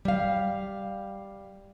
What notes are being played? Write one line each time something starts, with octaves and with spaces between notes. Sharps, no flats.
G3 F5